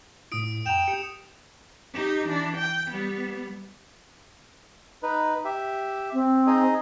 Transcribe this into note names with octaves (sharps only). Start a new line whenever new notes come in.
A2 E4 D#6 D7
F2 F#5 G5 A#5 E7 F7
G4 G6 C#7
D#4 G4
E3 D4
G5
G3 B3
D#4 B4
G4 E5
C4
D#4 G#4 D#5